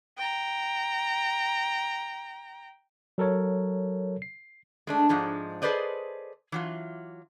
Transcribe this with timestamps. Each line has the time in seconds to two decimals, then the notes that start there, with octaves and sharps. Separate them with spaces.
0.18 G5 A#5
3.18 F#3 A4 A#4 C#5
4.22 C7
4.87 G#3 A3 D4
5.09 G#2 F3 G#3 D4
5.62 G#4 A4 B4 C5 D5 D#5
6.52 E3 F#3 F4